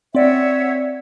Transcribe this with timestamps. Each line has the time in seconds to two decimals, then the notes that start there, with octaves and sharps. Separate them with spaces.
0.15 C4 C#5 D5 E5 F#5